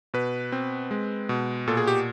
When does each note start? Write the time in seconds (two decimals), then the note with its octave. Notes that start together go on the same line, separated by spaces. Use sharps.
0.14 B2 B4
0.52 C4
0.91 G#3
1.29 B2
1.67 A#2 A4
1.77 G#4
1.88 G4